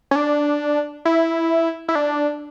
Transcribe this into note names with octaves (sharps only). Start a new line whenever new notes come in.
C#4
D4
E4
E4
D4